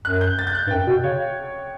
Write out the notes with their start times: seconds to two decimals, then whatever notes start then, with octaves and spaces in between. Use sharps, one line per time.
0.05 F#2 F#6
0.21 G6
0.39 A6
0.47 G6
0.54 F#6
0.67 G2
0.71 F#2 G5
0.87 B2
1.04 C#3 C#5